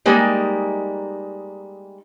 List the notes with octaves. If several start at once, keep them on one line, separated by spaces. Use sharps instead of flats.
G3 G#3 A#3 D#4